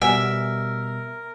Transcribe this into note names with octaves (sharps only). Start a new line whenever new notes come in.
B2 G3 A#4 E5 F#5 G#5